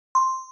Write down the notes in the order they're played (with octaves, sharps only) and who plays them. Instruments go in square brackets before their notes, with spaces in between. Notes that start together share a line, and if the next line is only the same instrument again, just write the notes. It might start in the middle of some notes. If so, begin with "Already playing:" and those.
[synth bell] C6